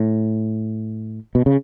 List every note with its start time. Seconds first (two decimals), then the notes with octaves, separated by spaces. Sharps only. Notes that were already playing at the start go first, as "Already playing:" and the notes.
Already playing: A2
1.35 B2
1.46 C#3